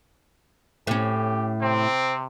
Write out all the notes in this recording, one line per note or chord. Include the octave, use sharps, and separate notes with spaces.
A2 C#4 G4
C3 C4